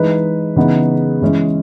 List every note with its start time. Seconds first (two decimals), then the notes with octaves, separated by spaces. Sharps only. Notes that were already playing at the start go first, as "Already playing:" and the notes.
Already playing: E3 G#3 D#4 B4
0.56 C#3 E3 B3 D#4
1.21 E3 G#3 C#4